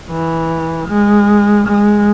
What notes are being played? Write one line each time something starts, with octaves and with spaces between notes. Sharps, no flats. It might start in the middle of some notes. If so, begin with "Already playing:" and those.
E3
G#3
G#3